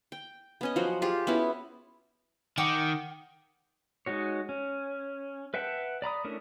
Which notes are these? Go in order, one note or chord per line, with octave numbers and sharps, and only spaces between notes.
G5
B3 C#4 D#5
F3 F#3 F#4 C5
F4 G4 G#4
B3 C#4 E4 F#4
D#3 F#5 G5 D6
G#3 D#4 F#4 C#5
C#4
B4 E5 F#5 G5 A5
D5 A#5 B5 D#6
A3 C#4 D4 E4 A#4